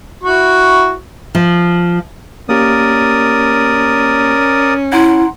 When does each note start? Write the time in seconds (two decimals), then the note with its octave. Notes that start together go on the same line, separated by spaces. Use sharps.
0.24 E4 F#4 C#6
1.35 F3
2.49 A#3 C#4 G4 A#4 D5 D#6
4.93 E4 F#5 A#5 C6